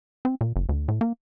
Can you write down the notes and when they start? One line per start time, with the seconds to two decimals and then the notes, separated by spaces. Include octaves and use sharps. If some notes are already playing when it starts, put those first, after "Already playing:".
0.25 C4
0.41 A#2
0.56 F#1
0.69 D2
0.88 A2
1.01 A#3